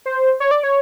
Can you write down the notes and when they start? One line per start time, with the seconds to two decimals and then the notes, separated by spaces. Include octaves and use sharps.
0.06 C5
0.40 C#5
0.51 D5
0.63 C#5